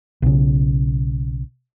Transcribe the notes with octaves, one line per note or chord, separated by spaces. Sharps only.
B1 C#3